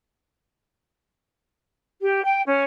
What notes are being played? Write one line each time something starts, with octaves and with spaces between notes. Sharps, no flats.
G4
G5
C#4